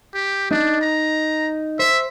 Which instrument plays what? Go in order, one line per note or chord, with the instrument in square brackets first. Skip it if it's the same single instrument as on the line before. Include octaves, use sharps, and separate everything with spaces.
[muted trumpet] G4
[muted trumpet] D4 [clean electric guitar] D#4
[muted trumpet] A#5
[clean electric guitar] C5 [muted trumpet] E5